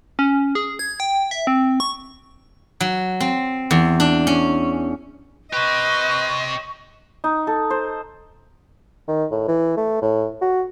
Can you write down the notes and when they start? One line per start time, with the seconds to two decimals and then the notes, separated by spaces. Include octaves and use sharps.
0.19 C#4
0.55 G#4
0.79 G#6
1.00 G5
1.31 E5
1.47 C4
1.80 C#6
2.80 F#3
3.20 C4
3.71 E2
4.00 D4
4.27 C#4
5.53 G4 B4 C5 D#5 C#6
7.24 D#4
7.47 A4
7.70 C5
9.08 D#3
9.31 A2
9.48 E3
9.77 A3
10.02 A2
10.42 F#4